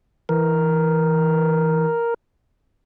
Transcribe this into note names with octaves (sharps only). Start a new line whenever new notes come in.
E3 A#4